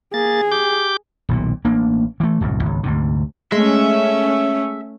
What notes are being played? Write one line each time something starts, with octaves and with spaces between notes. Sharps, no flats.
A#3 G#4 A6
G4 D6 G6
D#1 B1 A#2
A1 A#3 D4
E3 A3
D1 C2 F#2
G#1 C#2
D2 G#2 C3
G#3 A3 C#4 E5